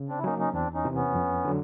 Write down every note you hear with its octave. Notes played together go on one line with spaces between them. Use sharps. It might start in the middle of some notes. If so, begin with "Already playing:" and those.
Already playing: C#3
C4 D4
E4
F#3 A#3 C#4 D#4
C#4 D#4
E2 C4 D4
C#4 D#4
C3 E3
B3 C#4
F2
D3 F#3